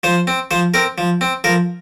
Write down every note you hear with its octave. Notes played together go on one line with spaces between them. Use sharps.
F3 C5
C4
F3 C5
C4 A#4
F3
C4
F3 A#4